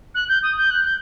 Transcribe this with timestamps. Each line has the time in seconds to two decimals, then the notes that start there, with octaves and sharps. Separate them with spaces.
0.15 F#6
0.29 G6
0.43 D#6
0.57 G6
0.70 F#6
0.84 G6